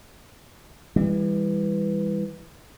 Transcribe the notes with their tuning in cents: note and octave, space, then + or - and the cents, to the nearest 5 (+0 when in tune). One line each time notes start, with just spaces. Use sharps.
E3 +0 G3 +40